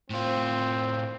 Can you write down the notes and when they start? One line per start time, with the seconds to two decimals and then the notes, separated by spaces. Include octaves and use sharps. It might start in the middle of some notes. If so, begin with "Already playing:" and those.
0.10 A2 C4 F4